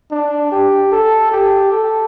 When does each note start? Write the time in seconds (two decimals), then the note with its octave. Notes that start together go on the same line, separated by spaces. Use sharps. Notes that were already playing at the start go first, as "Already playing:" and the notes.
0.11 D4
0.52 G4
0.92 A4
1.32 G4
1.72 A4